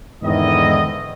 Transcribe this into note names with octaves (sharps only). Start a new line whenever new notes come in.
E2 G#2 D3 D#3 E4 D#5